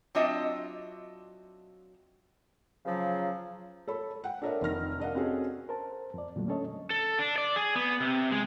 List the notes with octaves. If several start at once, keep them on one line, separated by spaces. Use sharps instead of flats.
F#3 C4 D4 F4 D#5 E5
C#3 F3 F#3
A4 C#5 B5
F#5 G5
D4 A4 A#4 C#5 D#5 E5
F1 D#3 F6 A#6
D4 A#4 D#5 F5 F#5
C4 C#4 F#4 G#4 A4
A#4 C5 A5
F2 D5
F2 A#2 D3 F#3 G3 A3
C#4 D4 A4 C#5 D#5
A4
D4
D5
G#4
B3
C3
G#3